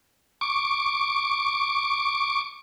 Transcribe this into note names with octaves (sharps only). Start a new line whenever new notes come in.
C#6 D6